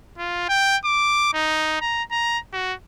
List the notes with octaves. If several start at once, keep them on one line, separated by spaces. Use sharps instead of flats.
F4
G5
D6
D#4
A#5
A#5
F#4